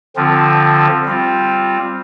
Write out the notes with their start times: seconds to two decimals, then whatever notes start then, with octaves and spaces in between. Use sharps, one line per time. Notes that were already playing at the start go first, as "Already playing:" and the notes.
0.16 D3 F3 C4 F4
1.05 G3 C4 F4